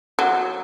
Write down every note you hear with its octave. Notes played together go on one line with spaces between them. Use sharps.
F#3